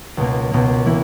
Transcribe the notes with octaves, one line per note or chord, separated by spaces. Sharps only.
C#2 B2 A#3
C#2 B2 A#3
E3 A#3 E4